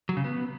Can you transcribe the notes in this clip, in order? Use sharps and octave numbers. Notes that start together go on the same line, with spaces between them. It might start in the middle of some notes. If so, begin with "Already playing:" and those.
F#3
C#3
B3